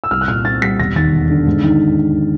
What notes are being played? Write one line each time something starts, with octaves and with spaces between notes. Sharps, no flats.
E6
C2 F6
F#6
A#2 F6
C4 A6
G3 B6
E1 A#6
D#2 A6
E1
D3
G#2
D#3